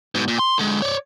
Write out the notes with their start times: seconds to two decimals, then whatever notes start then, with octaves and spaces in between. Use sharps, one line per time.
0.15 G#2 B2
0.28 A#2
0.39 C6
0.59 D3 G#3
0.82 C#5 D5